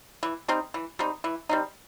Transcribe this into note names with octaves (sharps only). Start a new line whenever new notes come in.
E3
G3 C4 D#4
E3
G3 C4 D#4
E3
G3 C4 D#4